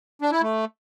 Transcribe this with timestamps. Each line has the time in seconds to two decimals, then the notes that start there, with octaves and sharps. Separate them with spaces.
0.22 D4
0.32 E4
0.42 A3